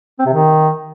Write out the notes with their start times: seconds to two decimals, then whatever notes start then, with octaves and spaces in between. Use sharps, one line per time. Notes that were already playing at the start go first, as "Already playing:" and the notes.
0.19 C4
0.26 C3
0.33 D#3